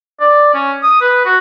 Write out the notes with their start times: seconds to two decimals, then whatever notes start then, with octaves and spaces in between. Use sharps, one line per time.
0.21 D5
0.54 C#4
0.83 D#6
1.01 B4
1.26 F#4